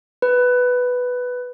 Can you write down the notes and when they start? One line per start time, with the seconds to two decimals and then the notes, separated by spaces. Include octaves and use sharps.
0.22 B4